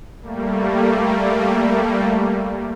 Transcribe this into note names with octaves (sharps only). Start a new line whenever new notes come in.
G3 A3 A#3